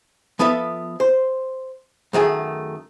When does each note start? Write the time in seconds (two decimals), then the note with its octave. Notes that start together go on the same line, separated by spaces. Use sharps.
0.39 F3 B3 A4 B4 E5
1.00 C5
2.13 F#2 D#3 A3 G#4